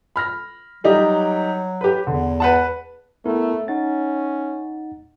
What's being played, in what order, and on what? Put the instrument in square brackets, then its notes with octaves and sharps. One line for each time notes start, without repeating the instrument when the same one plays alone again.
[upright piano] B5 F6 A#6
[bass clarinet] F#3 [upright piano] G3 D#4 G4
[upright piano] G4 B4
[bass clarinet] E2 [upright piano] D3
[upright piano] B4 F#5 A5
[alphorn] A3 [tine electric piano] B3 E4 A#4
[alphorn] C#4 [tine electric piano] D#4 F#5 A6